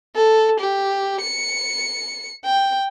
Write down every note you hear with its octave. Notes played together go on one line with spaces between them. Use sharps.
A4
G4
C#7
G5